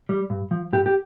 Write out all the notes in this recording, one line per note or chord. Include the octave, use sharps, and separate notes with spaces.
G3
G2
F3
G2 G4
G4